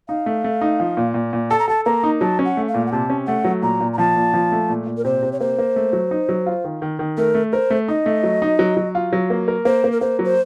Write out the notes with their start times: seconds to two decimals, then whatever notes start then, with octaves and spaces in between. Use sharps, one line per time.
0.08 D#4 F5
0.26 A3
0.44 A3
0.61 D#4
0.80 F3
0.97 A#2
1.14 A#2
1.33 A#2
1.51 A4 A5
1.59 A#5
1.68 A4 A5
1.85 A#3 A#5
2.03 D#4
2.21 F#3 A5
2.39 C#4
2.45 F#5
2.57 A3
2.68 F5
2.74 A#2
2.86 F#5
2.92 C3 A5
3.10 C#4
3.27 A3 F#5
3.44 F#3
3.62 A#2 A#5
3.81 A#2
3.93 A#5
3.98 F3 A5
4.16 A#2
4.34 F3
4.52 A3
4.69 A#2
4.86 A#2
4.97 A#4
5.05 C3 C5
5.22 C3
5.32 C#5
5.40 A#3 C5
5.58 A#3
5.76 A3
5.93 F#3
6.11 D#4
6.29 F#3
6.46 F4
6.64 D#3
6.82 D#3
6.99 D#3
7.17 A3 A#4
7.35 A3
7.53 A#4 C5
7.70 A3
7.88 D#4 D#5
8.06 A3
8.23 F#3
8.42 D#4
8.59 F#3
8.77 F#3
8.95 F4
9.13 F#3
9.30 A#3
9.48 A#4
9.65 A#3 C5
9.84 A#3
9.92 A#4
10.01 A#3 C5
10.19 F#3
10.25 C5